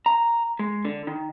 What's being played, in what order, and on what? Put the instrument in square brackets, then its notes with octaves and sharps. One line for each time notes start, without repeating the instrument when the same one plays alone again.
[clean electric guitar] A#5
G#3
D3
D#3